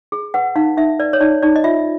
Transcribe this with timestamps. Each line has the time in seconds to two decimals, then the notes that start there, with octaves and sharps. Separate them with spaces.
0.12 G#4
0.34 B4 F#5
0.56 D#4 F5
0.77 D#4 E5
0.99 B4 D5
1.13 C#5
1.21 D#4 D5
1.42 D#4 D5
1.56 D#5
1.64 F4 E5